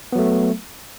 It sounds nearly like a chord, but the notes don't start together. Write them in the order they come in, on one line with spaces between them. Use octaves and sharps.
B3 F#3 A3